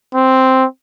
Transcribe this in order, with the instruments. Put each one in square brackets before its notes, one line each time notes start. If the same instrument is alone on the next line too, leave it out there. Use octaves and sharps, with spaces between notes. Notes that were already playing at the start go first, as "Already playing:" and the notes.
[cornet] C4